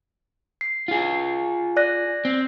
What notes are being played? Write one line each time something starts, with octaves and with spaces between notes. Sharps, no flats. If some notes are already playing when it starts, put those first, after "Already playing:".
C7
F4 G#4
D5 F#6 A#6
C4